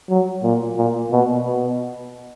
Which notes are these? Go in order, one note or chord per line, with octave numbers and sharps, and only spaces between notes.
F#3
A#2
A#2
B2
B2